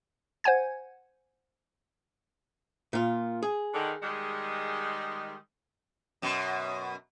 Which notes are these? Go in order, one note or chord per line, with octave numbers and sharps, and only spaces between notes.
C5 F#5 G#5 G#6
A#2 F4
G#4
D3 D#3
D#3 G3 G#3
F#2 B2